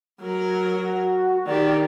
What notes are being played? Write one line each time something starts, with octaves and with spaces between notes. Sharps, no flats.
F#3 A#4
F#4
D#3 G4 D5